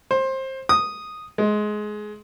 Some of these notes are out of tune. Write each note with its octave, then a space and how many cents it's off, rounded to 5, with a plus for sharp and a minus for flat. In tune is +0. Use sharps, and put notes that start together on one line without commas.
C5 +20
D#6 -5
G#3 +20